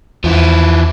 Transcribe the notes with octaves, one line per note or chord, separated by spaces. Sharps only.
E2 F3 E4